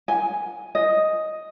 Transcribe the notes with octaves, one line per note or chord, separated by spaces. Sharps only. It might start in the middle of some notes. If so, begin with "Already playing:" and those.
G#5
D#5